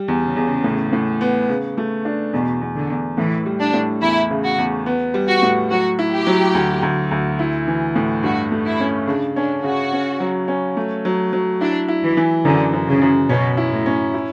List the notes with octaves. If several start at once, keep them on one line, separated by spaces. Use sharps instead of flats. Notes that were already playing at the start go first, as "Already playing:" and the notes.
Already playing: G3
E2
C#3
E2
A2
A2
B3
C#3
A3
D4
E2 B2
E2
D3
E2
A2 E3
G3
D4
A2
E2 E4
C#3
F#4
E2
B3
G3
F#4
A2
F#3 F#4
E4
G4
F#3
D2
D2
D2
E4
E3
A2
G2 F#4
A3
E4
C#4
C#3 D4
C#4 D4
C#3 F#4
C#4
F#3
C#4
A3
F#3
F#3
D4 E4
E4
E3
E3
F#2 D3
F#2
C#3
F#2
B2 C#4
E4
A2
C#4
E4